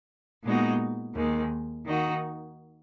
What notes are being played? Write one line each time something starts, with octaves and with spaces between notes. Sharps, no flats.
A#2 G#3 B3 D#4 F#4
D#2 D#3 G#3
D#3 A#3 D#4 F#4